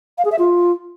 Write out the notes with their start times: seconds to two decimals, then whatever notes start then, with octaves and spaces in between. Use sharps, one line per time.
0.18 F5
0.25 G#4
0.32 E5
0.39 F4